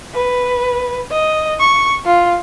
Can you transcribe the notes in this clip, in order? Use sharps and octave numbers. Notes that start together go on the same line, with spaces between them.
B4
D#5
C#6
F4